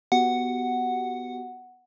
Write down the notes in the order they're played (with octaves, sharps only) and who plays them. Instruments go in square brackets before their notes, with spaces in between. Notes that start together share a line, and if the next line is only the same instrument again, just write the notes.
[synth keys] B3 F#4 G4 [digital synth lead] F#5